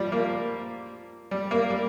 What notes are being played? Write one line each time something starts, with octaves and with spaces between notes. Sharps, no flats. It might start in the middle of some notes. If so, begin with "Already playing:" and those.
Already playing: F3 G3
A#3
G3
A#3
G3